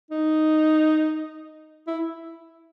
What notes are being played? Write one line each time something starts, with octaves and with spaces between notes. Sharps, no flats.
D#4
E4